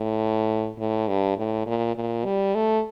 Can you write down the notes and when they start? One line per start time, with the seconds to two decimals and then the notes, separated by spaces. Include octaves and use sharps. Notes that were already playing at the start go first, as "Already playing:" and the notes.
Already playing: A2
0.78 A2
1.08 G2
1.37 A2
1.66 A#2
1.96 A#2
2.25 G3
2.55 A3